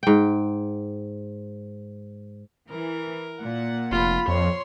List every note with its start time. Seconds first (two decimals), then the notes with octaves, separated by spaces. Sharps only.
0.03 G#2 G5
2.69 E3 A#4
3.42 A#2 F#5
3.91 F1 F4 B5
4.28 F2 C#5 C6